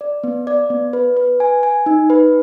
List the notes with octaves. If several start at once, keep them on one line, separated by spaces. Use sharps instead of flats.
D5
B3
D5
B3
B4
B4
G#5
G#5
D#4
B4